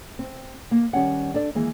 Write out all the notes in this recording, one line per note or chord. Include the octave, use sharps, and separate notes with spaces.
C4
A#3
D#3 G3 C#4 F#5
D4 A4 D5
D#3 E3 G#3 A#3